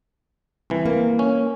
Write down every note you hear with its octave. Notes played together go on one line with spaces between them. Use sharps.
C2 E3
A#3
C#4